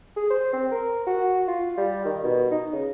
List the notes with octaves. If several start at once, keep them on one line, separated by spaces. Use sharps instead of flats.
G#4
C5
C4
A#4
F#4
F4
G3
D#3
B2
D#4
C#3